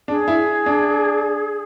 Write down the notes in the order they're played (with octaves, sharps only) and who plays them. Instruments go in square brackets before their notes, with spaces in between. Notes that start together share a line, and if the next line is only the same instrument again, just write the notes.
[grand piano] D4 [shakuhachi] G#4
[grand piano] E4
D4